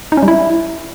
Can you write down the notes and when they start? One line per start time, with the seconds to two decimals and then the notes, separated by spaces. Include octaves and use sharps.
0.12 D#4
0.17 C#4
0.23 G3
0.28 E4